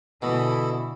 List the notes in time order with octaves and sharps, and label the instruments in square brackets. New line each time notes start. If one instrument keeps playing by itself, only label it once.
[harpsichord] B2 [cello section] D3 E3 E4 [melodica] A4 D#5 B5